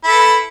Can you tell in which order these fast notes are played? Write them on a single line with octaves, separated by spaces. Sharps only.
E4 A4 B4